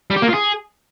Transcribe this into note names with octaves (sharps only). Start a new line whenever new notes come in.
G3
G4
A#3
F4
G#4